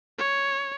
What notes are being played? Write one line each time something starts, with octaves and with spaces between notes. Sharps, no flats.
C#5